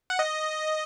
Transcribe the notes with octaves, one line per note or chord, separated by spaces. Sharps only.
F#5
D#5